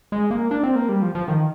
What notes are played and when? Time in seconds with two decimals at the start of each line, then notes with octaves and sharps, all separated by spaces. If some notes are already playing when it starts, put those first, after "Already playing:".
0.12 G#3
0.31 A#3
0.51 D4
0.63 C4
0.75 A#3
0.89 G3
1.02 F3
1.15 F3
1.28 D#3